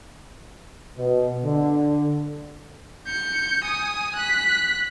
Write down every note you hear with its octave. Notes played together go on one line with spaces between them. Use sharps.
B2
D3
G6 C#7
G#5 D#6
F#6 B6